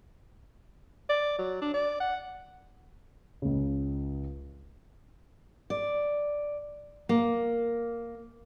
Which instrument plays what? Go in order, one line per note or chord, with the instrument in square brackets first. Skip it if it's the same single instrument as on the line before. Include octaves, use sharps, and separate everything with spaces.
[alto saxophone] D5
F#3
D4
D5
F#5
[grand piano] C#2 C#3
[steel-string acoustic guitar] D5
A#3